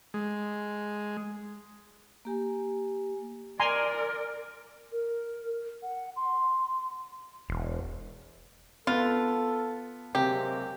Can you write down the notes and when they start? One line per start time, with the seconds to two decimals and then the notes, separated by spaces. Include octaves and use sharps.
0.14 G#3
2.25 A#3 G4 G#5
3.60 A#4 D5 G#5 A#5 C6
4.92 A#4
5.83 F#5
6.16 C6
7.49 E1
8.87 B3 F4 A4
10.15 C3 F#3 G#3 A#3 G4